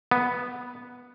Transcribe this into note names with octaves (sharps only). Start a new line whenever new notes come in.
B3